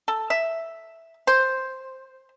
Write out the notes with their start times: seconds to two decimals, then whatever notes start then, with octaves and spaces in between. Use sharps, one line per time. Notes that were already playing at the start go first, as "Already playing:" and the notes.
0.08 A4
0.30 E5
1.27 C5